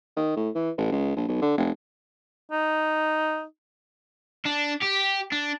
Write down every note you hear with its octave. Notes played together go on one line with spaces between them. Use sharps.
D#3
A2
E3
A1
C#2
A#1
B1
D3
F1
D#4
D4
G4
D4